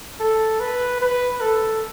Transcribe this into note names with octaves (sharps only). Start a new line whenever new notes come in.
A4
B4
B4
A4